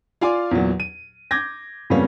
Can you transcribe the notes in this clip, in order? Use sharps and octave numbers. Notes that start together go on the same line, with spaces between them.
F4 D5 F5 G#5 C6 D6
E2 A#2 F#3
D#7
D6 G6 G#6 A#6
F2 C#3 G3 A#3 B3 C#4